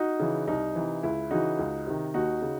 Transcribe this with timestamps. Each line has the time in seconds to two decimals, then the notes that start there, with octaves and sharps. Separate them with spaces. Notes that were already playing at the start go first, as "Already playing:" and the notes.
Already playing: D#4 F#4
0.19 C#3 E3
0.47 C2 D#4
0.75 C3 E3
1.03 C#2 E4
1.31 C#3 E3 D#4 F#4
1.59 C#2
1.87 C3 D#3
2.14 D#2 D#4 F#4
2.42 C#3